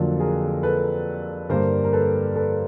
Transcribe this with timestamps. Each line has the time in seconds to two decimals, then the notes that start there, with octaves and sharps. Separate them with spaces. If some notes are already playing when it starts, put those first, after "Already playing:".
Already playing: F2 D3 F#3 A#3 F4
0.19 G#4 A#4
0.63 A4 B4
1.49 G2 D3 G3 A#3 A#4 C5
1.84 A#4
1.93 A4 B4
2.35 A4 B4